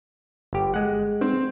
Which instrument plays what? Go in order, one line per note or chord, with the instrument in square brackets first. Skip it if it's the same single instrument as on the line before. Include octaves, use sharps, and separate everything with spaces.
[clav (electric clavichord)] G1 G4
G#3 F#5
[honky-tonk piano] C4